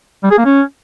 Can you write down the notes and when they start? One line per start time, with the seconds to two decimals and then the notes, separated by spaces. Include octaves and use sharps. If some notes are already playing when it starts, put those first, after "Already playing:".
0.24 G3
0.31 G#4
0.38 A#3
0.45 C#4